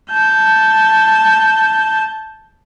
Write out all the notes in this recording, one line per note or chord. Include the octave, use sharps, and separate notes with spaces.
A5 G6